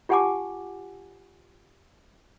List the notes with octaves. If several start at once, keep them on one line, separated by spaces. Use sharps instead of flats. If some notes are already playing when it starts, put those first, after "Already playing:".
F4 G4 F#5 G#5 A5 D6